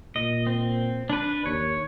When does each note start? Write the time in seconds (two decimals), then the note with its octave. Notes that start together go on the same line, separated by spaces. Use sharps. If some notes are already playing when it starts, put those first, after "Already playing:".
0.16 A#2 D#5
0.47 C4
1.10 D4 B4
1.46 D#2 C#5